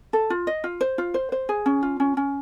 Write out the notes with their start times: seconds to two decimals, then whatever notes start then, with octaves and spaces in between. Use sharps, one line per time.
0.13 A4
0.30 F4
0.47 D#5
0.64 F4
0.81 C5
0.98 F4
1.14 C5
1.32 C5
1.49 G#4
1.66 C#4
1.83 F4
2.00 C#4
2.17 C#4